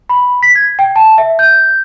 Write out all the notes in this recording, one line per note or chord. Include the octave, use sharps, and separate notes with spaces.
B5
B6
G#6
G5
A5
E5
G6